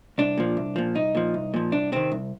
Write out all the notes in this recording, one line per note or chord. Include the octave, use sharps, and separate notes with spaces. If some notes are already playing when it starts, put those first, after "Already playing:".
C2 D4
A#2 F3
C2
A#2 F3
C2 D#4
A#2 F3
C2
A#2 F3
C2 D4
C3 D#3 C4
C2